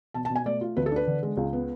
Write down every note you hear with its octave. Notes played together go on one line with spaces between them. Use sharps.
B2 A5
A5
B2
G#5
A3 D5
F4
D2 B4
A4
D4 B4
D3
G#3
C#2
B3